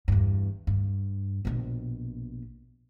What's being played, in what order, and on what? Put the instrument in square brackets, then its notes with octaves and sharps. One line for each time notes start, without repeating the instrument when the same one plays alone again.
[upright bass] E2 G2
G2
A#1 B2